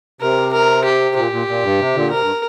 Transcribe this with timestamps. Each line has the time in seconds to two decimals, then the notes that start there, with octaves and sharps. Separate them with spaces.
0.21 C3 A#4
0.53 A#4
0.84 G4
1.16 A#2 G4
1.32 A#2
1.47 A#2
1.63 G2
1.79 C3
1.95 A#2 D3
2.11 C3 A#4
2.21 G2